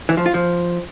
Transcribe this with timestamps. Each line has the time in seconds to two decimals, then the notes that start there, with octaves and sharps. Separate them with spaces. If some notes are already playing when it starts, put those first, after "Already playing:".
0.09 E3
0.17 F3
0.26 F4
0.34 F3